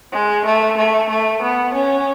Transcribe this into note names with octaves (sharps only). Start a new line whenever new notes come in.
G#3
A3
A3
A3
B3
C#4